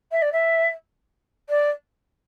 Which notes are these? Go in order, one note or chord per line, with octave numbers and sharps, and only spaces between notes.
E5
D5
E5
D5